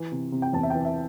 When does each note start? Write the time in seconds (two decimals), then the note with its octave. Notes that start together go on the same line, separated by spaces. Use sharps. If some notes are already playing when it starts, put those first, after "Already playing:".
Already playing: E3
0.12 C3
0.32 C3
0.42 G5
0.53 E2 A5
0.63 E5
0.70 E3 G5
0.85 E5